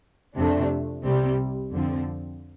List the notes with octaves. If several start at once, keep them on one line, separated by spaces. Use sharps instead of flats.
F2 C3 A3 D4
C2 C3 G3 C4
F2 D3 F3 C4